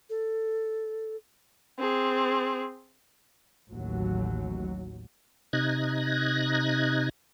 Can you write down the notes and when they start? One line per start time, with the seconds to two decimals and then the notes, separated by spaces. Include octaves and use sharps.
0.10 A4
1.79 C4 G#4
3.70 A1 D#2 F#3
5.53 C3 D#4 F#6 G#6 A#6